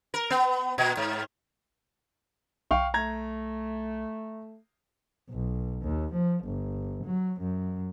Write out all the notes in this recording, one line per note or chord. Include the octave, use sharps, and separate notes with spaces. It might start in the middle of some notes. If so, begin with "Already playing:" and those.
A#4
B3
A#2
G#2
B1 F5 G5 C#6
A3 A#5 G#6
B1
D#2
F3
G1
F#3
F#2